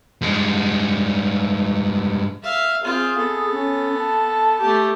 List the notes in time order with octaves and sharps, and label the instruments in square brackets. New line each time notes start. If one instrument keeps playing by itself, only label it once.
[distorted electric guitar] G2 G#3
[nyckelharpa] E5 F5
[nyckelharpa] C4 F4 [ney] G#4
[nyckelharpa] B3 A4
[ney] C#4
A5
[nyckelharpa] A3 G4